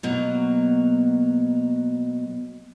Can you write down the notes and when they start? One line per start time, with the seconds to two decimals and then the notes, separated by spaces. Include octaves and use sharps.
0.03 B2 F#3 A#3